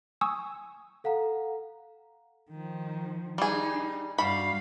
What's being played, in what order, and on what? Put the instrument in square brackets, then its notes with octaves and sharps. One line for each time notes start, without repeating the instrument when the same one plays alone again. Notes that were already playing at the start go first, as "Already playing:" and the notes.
[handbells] G#5 C#6 D#6 E6
[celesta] A4 F5 F#5 A#5
[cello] D#3 F3
[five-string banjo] G3 G#4 [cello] D#4
[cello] G2 F5 [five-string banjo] G3 F#4 B5